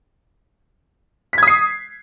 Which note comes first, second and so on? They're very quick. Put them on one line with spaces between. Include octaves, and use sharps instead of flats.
B6 G#6 D#6 C7